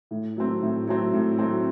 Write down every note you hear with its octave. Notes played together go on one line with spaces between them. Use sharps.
A2
F#3 A3 C4
A2
F#3 A3 C4
A2
F#3 A3 C4